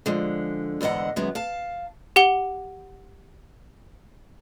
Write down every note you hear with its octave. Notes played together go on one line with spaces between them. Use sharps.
D3 F3 G#3
E2 G#2 D3 D#5 F#5
F#2 D#3 G#3 B3
F5 A5
G4 F#5 G7